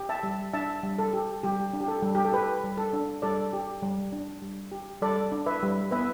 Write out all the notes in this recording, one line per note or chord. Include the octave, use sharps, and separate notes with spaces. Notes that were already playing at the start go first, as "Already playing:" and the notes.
Already playing: G4
E5 A5
G3
D4 E5 A5
G3
A4
G4
G3 G4
D4
G4
A4
G3
G4
A4
G4 B4
G3
A4
D4
G3 A4 D5
G4
G3
D4
G3
G4
G3 A4 D5
D4
B4 E5
G3
B3 B4 E5